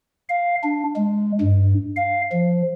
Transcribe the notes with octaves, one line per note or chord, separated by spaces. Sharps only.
F5
D4
G#3
G2
F5
F3